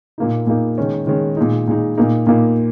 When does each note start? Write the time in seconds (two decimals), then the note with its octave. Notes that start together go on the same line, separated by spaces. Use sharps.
0.18 A#2 A#3 D#4
0.47 A#2 A#3 D#4
0.78 D#3 G#3 C#4
1.07 D#3 G#3 C#4
1.37 A#2 G#3 D#4
1.68 A#2 G#3 D#4
1.97 A#2 A#3 D#4
2.27 A#2 A#3 D#4